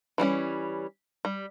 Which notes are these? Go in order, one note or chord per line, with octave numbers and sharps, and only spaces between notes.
E3 G3 C4 C#4
G3